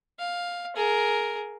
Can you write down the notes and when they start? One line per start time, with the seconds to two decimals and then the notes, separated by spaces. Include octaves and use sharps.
0.19 F5
0.76 G#4 A#4